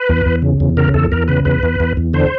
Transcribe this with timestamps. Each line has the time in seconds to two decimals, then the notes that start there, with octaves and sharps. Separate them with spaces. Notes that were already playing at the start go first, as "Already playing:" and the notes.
Already playing: B4
0.09 E2
0.26 E2
0.42 C#3
0.60 E2
0.77 C#3 A#4
0.94 E2 A4
1.12 E2 A#4
1.28 C#3 B4
1.45 E2 B4
1.63 E2
1.80 E2
1.97 E2
2.14 D3 C5